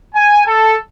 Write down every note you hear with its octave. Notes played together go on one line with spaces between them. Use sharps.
G#5
A4